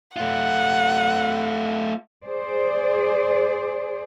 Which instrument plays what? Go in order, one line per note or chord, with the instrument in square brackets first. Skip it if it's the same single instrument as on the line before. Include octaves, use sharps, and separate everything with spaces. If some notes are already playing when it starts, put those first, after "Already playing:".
[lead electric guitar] A3 F4 [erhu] F#5
[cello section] G#4 C5 D5